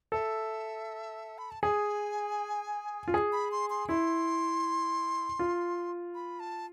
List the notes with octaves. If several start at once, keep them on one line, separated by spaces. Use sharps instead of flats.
A4 E5
B5
A5
G#4 G#5
F4
G#4
B5
C6
C6
E4 C6
F4
B5
A5